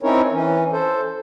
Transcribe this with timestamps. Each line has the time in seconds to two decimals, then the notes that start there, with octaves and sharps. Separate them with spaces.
0.03 C4 C#4 D#4 E4 A#4 C#5
0.32 E3 C#4
0.72 A4 C5